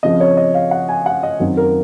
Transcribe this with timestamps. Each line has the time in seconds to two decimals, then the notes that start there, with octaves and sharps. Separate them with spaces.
0.03 C#3 F3 C4 D#5
0.20 C#5
0.37 D#5
0.54 F5
0.71 F#5
0.89 G#5
1.06 F#5
1.23 D#5
1.40 F#2 D#3 F#3 C4
1.57 A#4